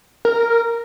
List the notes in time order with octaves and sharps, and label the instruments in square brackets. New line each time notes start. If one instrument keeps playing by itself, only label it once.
[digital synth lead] A#4